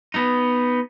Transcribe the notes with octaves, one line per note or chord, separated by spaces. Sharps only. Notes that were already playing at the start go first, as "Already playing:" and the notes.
B3 D#4